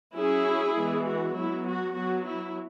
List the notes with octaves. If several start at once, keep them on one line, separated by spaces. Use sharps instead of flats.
F#3 C#4 E4 G#4
E3 G#3 B3
F#4
F#3 B3 E4
F#4
F#3 B3 F#4
E4